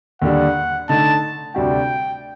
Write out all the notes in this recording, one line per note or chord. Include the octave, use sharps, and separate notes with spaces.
D#2 D3 G3 D4 F#5
D3 A3 D#4 A5
D2 C3 G3 D4 F#4 G5